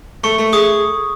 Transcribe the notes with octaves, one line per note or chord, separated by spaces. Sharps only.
A3 C#6
A3
G#4 D#6